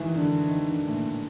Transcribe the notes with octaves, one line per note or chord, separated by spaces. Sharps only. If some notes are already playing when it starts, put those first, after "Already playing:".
Already playing: D#3 E3
D3
D#3
D3
A2
A#2